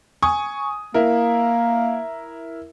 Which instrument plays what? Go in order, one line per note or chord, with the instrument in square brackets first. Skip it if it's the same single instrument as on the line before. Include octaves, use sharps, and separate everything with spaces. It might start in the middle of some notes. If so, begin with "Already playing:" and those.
[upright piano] G#5 C#6 D#6
[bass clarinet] A#3 [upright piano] E4 A#4